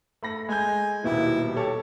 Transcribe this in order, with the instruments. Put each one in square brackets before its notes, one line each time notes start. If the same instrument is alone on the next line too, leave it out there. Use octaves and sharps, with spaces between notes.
[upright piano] A3 B5 A#6
[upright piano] G#3 G6 [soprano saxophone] G#5
[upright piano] D#1 D#2 B2 [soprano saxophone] E4
[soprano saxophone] G4 [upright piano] A4 C#5